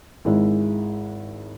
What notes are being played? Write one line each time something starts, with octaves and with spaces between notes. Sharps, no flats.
G#1 G#3 E4